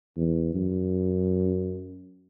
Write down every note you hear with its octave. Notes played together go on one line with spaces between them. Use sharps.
E2
F#2